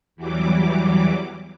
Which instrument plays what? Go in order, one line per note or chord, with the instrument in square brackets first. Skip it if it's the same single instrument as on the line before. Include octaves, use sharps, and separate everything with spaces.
[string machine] E2 E3 F#3 G3 D6